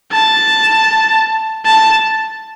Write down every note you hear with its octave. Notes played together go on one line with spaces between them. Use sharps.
A5
A5